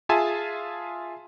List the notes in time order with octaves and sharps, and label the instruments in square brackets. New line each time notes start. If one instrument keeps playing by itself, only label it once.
[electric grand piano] F4 G#4 E5 G#5 A5 C6